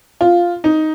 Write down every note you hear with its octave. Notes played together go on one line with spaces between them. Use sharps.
F4
D#4